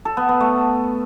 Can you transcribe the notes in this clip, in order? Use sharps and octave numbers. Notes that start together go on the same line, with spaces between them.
A4
B3
B3
A3